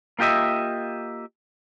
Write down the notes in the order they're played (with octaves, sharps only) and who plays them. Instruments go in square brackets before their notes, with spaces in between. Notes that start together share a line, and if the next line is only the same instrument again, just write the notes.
[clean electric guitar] A#3 F4 G4 D#5 E5